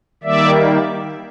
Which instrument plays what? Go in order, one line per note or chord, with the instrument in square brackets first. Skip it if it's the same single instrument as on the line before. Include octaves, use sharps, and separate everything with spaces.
[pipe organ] D#3 G3 A#3 D5 E5